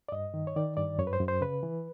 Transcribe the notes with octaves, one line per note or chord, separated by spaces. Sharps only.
D5
G2 D#5
D#3
C#5
D#3 D5
G2 D5
F#2 C#5
B4
C5
F#2
C5
C#3 B4
E3